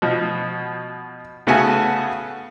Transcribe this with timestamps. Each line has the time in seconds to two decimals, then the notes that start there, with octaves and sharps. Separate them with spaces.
0.02 B2 F3
1.47 C#3 A3 B3 F#4 F#5 G#5